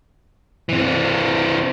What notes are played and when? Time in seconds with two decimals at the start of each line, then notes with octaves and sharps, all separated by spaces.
0.69 E3 C4